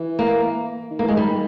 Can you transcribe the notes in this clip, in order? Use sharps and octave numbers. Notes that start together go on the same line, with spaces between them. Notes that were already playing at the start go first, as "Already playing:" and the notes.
Already playing: E3
A#3
D#3
A#3
E3
G#3
D#3 G3